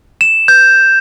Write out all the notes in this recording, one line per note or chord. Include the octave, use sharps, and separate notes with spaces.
E7
G6